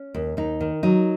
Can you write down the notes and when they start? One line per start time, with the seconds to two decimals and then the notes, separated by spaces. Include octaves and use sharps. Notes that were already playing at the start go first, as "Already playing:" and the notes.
Already playing: C#4
0.14 D#2
0.37 D#2 D#4
0.61 D#3
0.83 F#3 D#4